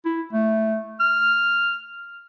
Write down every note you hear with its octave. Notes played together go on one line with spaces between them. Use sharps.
E4
A3
F6